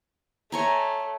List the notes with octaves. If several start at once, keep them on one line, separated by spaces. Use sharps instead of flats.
A3 C#5 G#5 A#5